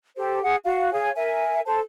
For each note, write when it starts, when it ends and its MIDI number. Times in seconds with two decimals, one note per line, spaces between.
0.17 0.40 67
0.17 0.40 69
0.17 0.40 72
0.43 0.56 68
0.43 0.56 78
0.64 0.92 66
0.64 0.92 77
0.93 1.10 68
0.93 1.10 73
0.93 1.10 77
0.93 1.10 80
1.16 1.61 70
1.16 1.61 76
1.16 1.61 80
1.65 1.79 69
1.65 1.79 72
1.65 1.79 81